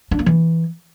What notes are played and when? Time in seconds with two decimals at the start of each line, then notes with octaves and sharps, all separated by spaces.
0.11 D4
0.19 A#3
0.26 E3